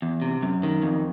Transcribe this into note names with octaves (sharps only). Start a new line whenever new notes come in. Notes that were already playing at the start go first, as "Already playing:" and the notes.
E2
C3
F#2
D#3
F2